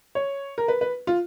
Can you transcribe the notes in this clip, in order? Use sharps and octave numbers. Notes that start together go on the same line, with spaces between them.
C#5
A#4
B4
B4
F4